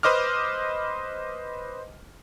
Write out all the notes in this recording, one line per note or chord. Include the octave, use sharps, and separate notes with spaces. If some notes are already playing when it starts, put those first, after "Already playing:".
B4 C5 D#5 D6 F6